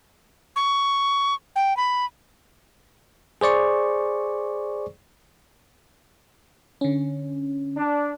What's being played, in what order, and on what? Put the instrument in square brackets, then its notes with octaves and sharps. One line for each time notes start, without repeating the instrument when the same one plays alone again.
[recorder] C#6
G5
B5
[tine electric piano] G#4 C5 D5 C#6
[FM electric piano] D3 C#4
[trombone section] D4